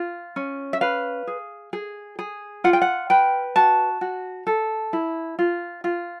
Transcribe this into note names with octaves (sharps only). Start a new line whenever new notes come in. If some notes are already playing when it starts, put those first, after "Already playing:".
Already playing: F4
C#4
E5
B4 F5
G#4
G#4
G#4
F4 F#5
G5
F#5
B4 G5
F#4 A5
F#4
A4
E4
F4
F4